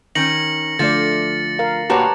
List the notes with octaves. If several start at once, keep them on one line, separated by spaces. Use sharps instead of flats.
D#3 C#4 A#6 C#7 F#7
D3 F3 A3 F4 D5 A6 C#7
A#4 F5
A#2 A#3 F#4 G4 B4 C#5 A5 A#5